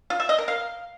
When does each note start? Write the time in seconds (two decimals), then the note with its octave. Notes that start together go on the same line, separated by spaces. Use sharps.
0.10 F4
0.20 E5
0.29 D#5
0.38 A#4
0.48 F5